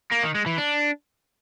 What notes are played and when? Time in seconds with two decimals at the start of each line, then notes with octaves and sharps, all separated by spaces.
0.11 A#3
0.23 D#3
0.35 G#3
0.46 E3
0.58 D4